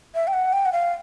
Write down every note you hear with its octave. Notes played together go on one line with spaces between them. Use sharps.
E5
G5
F#5
G5
F#5
F5